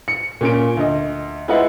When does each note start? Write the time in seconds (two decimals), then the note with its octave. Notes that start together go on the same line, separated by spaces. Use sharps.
0.08 C#7
0.41 A#2 C#4 D7
0.77 D2 D#5
1.48 G#3 E4 F4 B4 D#5 F#5